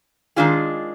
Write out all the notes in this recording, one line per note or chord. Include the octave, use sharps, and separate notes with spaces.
D#3 G#3 D4 F4 G#4